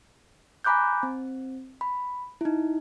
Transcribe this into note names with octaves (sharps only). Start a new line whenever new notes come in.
G#5 A#5 B5 D6 F#6 G6
C4
B5
D#4 E4